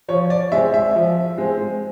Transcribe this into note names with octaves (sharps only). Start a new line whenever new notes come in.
F3 C#5
D5
G#3 C4 E5
E5
F3
G#3 C4